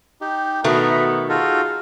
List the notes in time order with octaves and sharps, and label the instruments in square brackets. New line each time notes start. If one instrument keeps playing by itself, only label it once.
[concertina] D#4 G4
[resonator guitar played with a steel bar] B2 D#3 A3 [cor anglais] B3 [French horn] F#4 [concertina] B4 A#5
[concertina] D#4 F#4 A4 [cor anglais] F4 [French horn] G#4